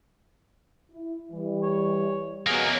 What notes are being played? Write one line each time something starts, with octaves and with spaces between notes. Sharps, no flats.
E4
E3 G3
C#5
B2 F#3 A#3 G#4